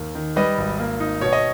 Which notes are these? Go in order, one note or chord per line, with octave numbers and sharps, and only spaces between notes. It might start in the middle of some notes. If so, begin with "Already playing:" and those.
Already playing: D#2 A#3
D#3
G3 B4 D#5
G#1
A#3
D#4
B2 C#5
D#5